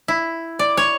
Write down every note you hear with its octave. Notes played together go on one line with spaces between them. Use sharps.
E4
D5
C#5